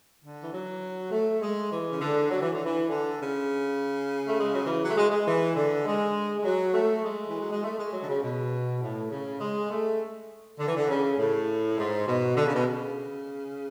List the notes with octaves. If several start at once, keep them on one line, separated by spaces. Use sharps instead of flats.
D3
E3
F#3
A3
G#3
E3
C#3
D3
F#3
E3
D3
E3
D3
C#3
A3
G#3
F#3
E3
F#3
A3
G#3
G#3
E3
D3
G#3
G#3
F#3
A3
G#3
E3
F#3
G#3
A3
G#3
F#3
D3
C#3
B2
A2
C#3
G#3
A3
D3
E3
D3
C#3
A2
G#2
B2
D3
C#3
B2
C#3